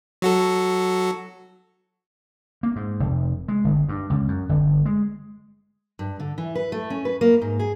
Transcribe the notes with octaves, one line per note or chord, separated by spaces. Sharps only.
F#3 F#4 A4
A#3
G#2
F1
G#3
G1
G2
C#2
F#2
G1
G#3
G2
D3
E3
B4
A3
C#4
B4
A#3
G#2
G#4